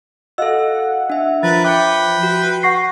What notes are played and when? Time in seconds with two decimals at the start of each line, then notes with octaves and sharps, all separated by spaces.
0.38 F#4 A4 D#5 F5 F#5 E6
1.10 D4 E5
1.43 F3 A#4 B4 A6
1.64 B4 E5 G5 D6 C#7
2.23 F#4
2.63 F#5 C#6 A#6 C7